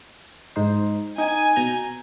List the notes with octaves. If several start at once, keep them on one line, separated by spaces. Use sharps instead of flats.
G#2 D#4 C5
D#4 G#5
B2 A#5 G6